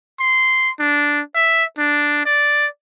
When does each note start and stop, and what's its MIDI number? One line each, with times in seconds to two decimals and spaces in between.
0.20 0.70 84
0.80 1.21 62
1.35 1.64 76
1.78 2.24 62
2.26 2.66 74